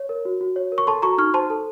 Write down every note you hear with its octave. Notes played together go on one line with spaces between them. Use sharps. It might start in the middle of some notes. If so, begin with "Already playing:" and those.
Already playing: C#5
A#4
F#4
F#4
C#5
A#4
C#6
A4 A5 C6
F#4 A#5 C#6
D#4 C#6 F6
C5 A5 C6
A4